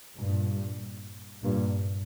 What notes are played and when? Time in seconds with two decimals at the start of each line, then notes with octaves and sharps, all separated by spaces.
0.18 G2 A#2
1.43 G2 A#2